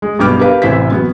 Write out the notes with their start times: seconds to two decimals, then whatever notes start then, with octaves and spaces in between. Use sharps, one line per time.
0.02 G#3
0.19 B1 G2 B3 G5 D6 F6
0.40 G4 A#4 B4 F5
0.62 A1 C3 E3 C5 E5 B6
0.91 F#3 B3